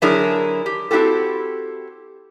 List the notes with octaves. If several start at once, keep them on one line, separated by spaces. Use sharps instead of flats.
D3 F#3 D4 E4 G#4 A#4
G4
C4 E4 F#4 G4 A4